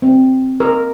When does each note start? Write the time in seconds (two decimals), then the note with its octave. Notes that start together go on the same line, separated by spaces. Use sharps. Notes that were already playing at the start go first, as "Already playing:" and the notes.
0.02 C4
0.60 A#4